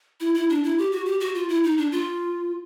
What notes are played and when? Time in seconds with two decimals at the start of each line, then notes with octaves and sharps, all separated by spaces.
0.21 E4
0.35 E4
0.50 D4
0.64 E4
0.78 G4
0.92 F#4
1.06 G4
1.20 F#4
1.35 F4
1.49 E4
1.64 D#4
1.78 D4
1.92 F4